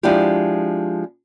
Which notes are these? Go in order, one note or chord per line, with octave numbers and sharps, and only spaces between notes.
F3 G#3 D4 E4 G4